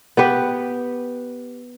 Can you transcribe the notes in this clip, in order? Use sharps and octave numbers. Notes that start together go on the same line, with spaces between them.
B3 G4 B4